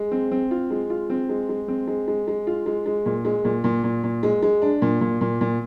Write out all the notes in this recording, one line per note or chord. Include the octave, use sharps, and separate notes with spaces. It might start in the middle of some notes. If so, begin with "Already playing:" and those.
Already playing: G#3
C4
C4
F4
G#3
F4
C4
G#3
G#3
C4
G#3
G#3
G#3
F4
G#3
G#3
A#2
G#3
A#2
A#2
A#2
A#2
G#3
G#3
D4
A#2
A#2
A#2
A#2